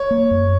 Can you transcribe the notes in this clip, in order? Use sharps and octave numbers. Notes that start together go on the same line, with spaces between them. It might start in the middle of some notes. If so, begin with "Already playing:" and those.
Already playing: C#5
A#3
F#2